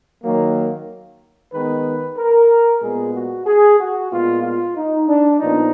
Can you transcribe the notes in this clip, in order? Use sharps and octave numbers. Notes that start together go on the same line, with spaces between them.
D#3 F#3 A#3
D#3 G#3 B3 B4
A#4
A#2 G#3 B3 G#4
F#4
G#4
F#4
A#2 G#3 B3 F4
F4
D#4
D4
A#2 F3 B3 D#4